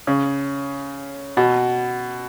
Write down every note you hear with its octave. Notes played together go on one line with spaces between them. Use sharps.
C#3
B2